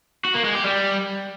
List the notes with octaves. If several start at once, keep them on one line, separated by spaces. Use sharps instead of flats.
F#4
A#3
G#3
G4
G3